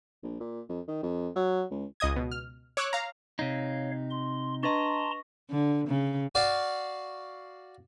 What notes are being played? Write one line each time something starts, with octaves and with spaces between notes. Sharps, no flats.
A#1
A#2
F2
D#3
F2
F#3
C#2
C#2 D#5 D#6 G#6
B2
F6
C#5 D6 E6 F#6
F5 A#5
C3 D#4 C#5 F5
C6
D4 B4 D#5 A5 A#5 C6 C#6 A#6
D3
C#3
F#4 D5 F5